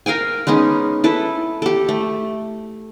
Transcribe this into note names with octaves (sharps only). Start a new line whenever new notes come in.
A#4 F5 G5 G#5
G#3 B3 C#4 D#4
E4 A4 B4
G4 A4
A3